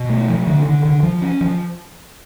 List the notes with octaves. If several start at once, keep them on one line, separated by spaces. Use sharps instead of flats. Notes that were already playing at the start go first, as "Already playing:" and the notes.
Already playing: B2
A3
F3
D3
D3
D3
F3
C#4
F3